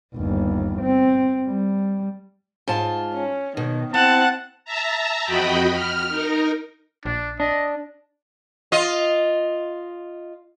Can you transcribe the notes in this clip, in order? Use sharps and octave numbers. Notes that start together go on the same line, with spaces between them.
G1 D#2
C4
G3
G#2 F4 A5
C#4
B2 D#3
C4 E4 F#5 A5
E5 A5 A#5
F2 F#4 D#5 G5 B5
F6
D#4 A#4
A#1 D4
D4 D#5
F4 D#5